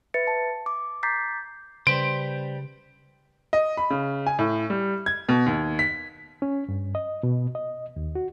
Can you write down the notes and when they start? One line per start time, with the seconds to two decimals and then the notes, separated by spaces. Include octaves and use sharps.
0.14 B4 E5 A6 C#7
0.27 A5
0.66 D6
1.03 A#5 D6 G6 A6 B6 C7
1.87 C#3 G3 B4 C5 D7
3.53 D#5
3.77 B5
3.90 C#3
4.27 G#5
4.39 A2
4.70 G3
5.06 G#6
5.29 B2
5.46 D#2
5.79 B6
6.42 C#4
6.69 G2
6.95 D#5
7.23 B2
7.55 D#5
7.96 D#2
8.15 F#4